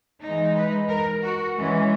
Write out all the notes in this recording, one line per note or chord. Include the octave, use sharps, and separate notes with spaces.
E3 G#3 D#4
B4
A#4
F#4
E3 G#3 C#4